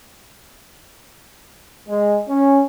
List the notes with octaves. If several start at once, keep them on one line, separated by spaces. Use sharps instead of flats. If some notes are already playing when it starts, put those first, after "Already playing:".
G#3
C#4